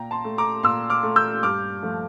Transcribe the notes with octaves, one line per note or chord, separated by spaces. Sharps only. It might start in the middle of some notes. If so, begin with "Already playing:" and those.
Already playing: A#2 G5 A#5
A5 C6
A3
A#5 D6
A#2 C6 E6
D6 F6
A3
E6 G6
G2 D6 F6
F3 A3